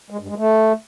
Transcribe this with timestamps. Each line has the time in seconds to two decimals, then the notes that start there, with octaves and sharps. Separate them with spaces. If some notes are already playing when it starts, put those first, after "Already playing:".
0.10 G#3
0.19 G2
0.28 G#3
0.37 A3